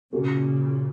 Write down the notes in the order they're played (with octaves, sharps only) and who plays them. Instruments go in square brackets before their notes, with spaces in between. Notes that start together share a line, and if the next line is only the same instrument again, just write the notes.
[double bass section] A#2 C#3 [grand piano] A#3 C#4 F#4 A#4